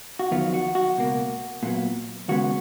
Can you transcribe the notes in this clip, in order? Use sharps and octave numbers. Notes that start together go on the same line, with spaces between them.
F#4
F2 D#3 F#3 B3 F4
F#4
F#4
C#2 B2 A#3
A#2 F#3 B3
D#2 C#3 G#3 B3 F#4